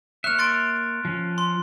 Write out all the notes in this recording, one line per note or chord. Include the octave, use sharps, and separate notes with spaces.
A#3 C#5 E5 F6 F#6
C6 A6 D7
F3 C#4
C6